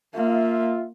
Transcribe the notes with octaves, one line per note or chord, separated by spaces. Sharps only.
A#3 F4 E5